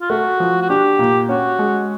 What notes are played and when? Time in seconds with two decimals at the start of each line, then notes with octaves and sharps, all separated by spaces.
0.01 F4
0.10 A3 F#4
0.40 F3
0.62 F#4
0.70 D4 G4
0.99 A#2
1.29 C#4 F#4
1.59 G#3